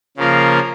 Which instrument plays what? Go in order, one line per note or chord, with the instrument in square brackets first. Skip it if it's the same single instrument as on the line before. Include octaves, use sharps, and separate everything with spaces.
[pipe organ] C#3 F3 A#3 F4 A#4